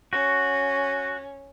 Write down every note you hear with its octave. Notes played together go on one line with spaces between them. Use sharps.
C#4 F#4